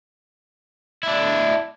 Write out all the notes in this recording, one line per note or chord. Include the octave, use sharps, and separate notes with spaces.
D4 E4